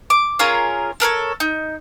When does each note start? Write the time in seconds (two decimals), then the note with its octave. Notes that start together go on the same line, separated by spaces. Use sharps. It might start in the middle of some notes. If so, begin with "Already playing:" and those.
0.10 D6
0.39 C#4 F4 G#4 A#4
1.00 A4 A#4 C5 C#5
1.40 D#4